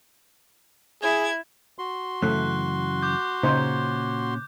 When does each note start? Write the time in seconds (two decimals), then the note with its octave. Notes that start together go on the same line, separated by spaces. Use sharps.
1.03 E4 G#4 G#6
1.79 F#4 C6
2.23 F#2 C#3 E3 A3 F#6
3.02 D6 G6
3.43 A#2 C#3 C#4 D#4 C5